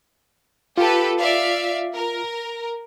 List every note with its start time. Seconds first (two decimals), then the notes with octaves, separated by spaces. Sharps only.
0.78 F4 G4 A4 B4
1.20 D5 E5 F5
1.94 A#4